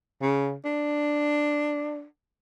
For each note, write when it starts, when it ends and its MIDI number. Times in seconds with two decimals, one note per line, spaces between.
0.22 0.55 49
0.65 2.05 62